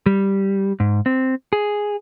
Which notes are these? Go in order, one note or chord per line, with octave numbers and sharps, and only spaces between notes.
G3
G#2
C4
G#4